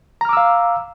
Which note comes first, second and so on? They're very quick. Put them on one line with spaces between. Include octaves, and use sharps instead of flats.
A#5 F6 D6 E6 F5